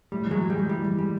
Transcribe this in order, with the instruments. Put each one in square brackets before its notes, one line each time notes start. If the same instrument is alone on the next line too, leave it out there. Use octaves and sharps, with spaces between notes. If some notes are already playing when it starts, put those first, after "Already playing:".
[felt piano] A2 [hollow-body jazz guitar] G3
[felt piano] E3 [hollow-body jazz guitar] F#3 G#3
[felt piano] A2
[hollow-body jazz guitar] G3
[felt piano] G#3
[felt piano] E3 [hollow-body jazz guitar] G3
[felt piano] E3
[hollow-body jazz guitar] G3 [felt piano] G#3